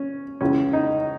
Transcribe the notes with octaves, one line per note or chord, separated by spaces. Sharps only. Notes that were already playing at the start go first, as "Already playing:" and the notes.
Already playing: C#4
C#2 C#3 E3 C#4
D#4